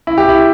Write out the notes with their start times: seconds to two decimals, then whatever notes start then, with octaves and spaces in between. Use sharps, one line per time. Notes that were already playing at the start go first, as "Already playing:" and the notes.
0.07 E4
0.18 G4
0.29 E4